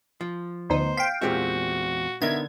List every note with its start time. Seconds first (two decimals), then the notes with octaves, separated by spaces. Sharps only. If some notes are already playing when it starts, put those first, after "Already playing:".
0.21 F3
0.70 D2 B3 D#4 C5
0.97 F5 G5 B6
1.22 E2 A#2 G#3 C4 F#4 G4 E5
2.22 D3 B3 D#4 A#4 E5 G#6